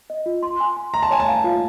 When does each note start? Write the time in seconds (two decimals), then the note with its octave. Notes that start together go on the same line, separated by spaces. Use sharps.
0.10 D#5
0.26 F4
0.43 C6
0.60 G#5
0.76 C6
0.94 A#5 C6
1.03 A5
1.10 C#5 G#5
1.20 A5
1.28 F5
1.44 F4